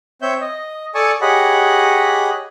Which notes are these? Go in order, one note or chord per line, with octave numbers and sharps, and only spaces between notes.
C4 C#5 E5 G6
D#5
A4 D5 G#5 A5 C#6 D#6
G4 G#4 C#5 D#5 F#5 B5